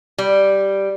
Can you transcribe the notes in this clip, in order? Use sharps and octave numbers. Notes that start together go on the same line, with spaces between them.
G3